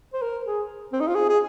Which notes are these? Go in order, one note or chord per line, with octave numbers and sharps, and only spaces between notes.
C5
A#4
G#4
C4
D#4
F4
G#4
G#4